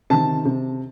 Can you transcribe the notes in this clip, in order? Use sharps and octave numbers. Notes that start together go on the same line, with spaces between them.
C3 D#3 A5
C3